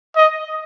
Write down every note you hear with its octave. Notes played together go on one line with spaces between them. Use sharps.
D#5